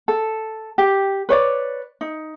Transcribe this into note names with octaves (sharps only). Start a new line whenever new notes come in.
A4
G4
B4 C#5 D5
D#4